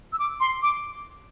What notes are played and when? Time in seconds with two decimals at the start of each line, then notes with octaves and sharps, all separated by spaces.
0.12 E6
0.19 D6
0.40 C6
0.62 D6